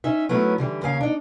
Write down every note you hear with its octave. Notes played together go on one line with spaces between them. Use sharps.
C#4 D#4 E5
F#3 A3 B3 C#4 E4
D3 E3 G3
D#2 C#3 C#4 F5
D4 D#4